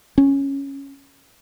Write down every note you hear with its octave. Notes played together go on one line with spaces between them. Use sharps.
C#4